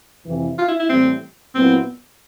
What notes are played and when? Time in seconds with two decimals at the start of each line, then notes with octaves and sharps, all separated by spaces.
0.25 F2 C3 E3
0.58 F4
0.68 E4
0.79 E4
0.89 A2 E3 G3 C4
1.55 A#2 F#3 B3 C4 E4